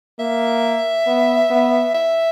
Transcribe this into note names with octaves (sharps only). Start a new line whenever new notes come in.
A#3 E5
B3
B3
E5